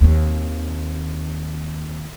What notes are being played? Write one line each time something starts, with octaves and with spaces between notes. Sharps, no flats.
D#2 C4